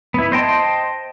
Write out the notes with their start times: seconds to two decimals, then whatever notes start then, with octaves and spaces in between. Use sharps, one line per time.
0.14 B3 E4
0.32 C5 D#5 G5 A5 C6